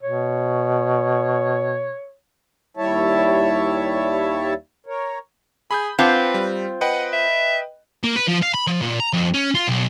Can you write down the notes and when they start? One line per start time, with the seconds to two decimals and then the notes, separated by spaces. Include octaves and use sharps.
0.03 B2 C#5
2.77 D#2 G3 E4 C#5 E5 A5
4.86 A#4 C#5
5.71 G#4 B5 D#6 G6
5.99 C4 F4 B4 F#5 A5 D6
6.34 G3
6.81 B4 D#5 F#5 G5
7.12 E5
8.04 A#3
8.16 B4
8.28 F3
8.42 F5
8.54 B5
8.67 F3
8.82 A#2
9.00 A#5
9.13 F2
9.34 C#4
9.55 F4
9.68 B1